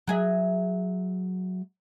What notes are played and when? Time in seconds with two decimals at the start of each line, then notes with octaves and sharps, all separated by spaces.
0.07 F#3 G#4 E5